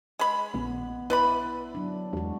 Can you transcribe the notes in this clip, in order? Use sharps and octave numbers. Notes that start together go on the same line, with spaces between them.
G#3 B5
A#1 B3
E4 B4 D5 B5
F#3 D4
E2 G#3 F#4